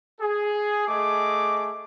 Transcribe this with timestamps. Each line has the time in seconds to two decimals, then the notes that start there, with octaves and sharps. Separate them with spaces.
0.20 G#4
0.87 A3 G#4 D#5 D6